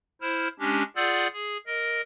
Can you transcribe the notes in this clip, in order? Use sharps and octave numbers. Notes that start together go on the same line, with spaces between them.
E4 C5 F6
G#3 C#4 D4 G4
F4 G#4 D5 F#5 E6 G6
G#4
A#4 D#5